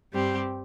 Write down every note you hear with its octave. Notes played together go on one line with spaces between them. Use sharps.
G2 G3 C4 G4